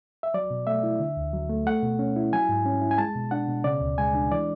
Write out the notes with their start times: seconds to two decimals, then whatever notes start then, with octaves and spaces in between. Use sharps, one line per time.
0.23 E5
0.34 F#3 D5
0.51 B2
0.67 A3 E5
0.83 E4
1.00 D3
1.17 D2
1.33 F#3
1.49 A3
1.67 A3 F#5
1.82 B2
1.99 C#4
2.16 E4
2.33 F#3 G#5
2.49 G#2
2.66 C#4
2.81 E4
2.91 G#5
2.98 G#3 A5
3.15 B2
3.31 D4 F#5
3.48 B2
3.64 C#3 D5
3.81 D2
3.98 G#3 G#5
4.15 D4
4.32 E3 D5